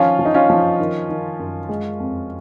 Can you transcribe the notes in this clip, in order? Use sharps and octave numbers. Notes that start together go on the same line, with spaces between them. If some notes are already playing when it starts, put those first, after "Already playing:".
Already playing: D#3 F3 C#4 F4
F3
D#4
C#4 F4
F3
D#3
D#3
F#2
G#3
F2